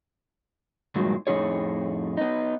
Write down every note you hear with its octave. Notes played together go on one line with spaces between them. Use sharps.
G2 A#2 D#3 F#3 G#3
F2 A2 C#3 D#4 G#4 C#5
B3 D#4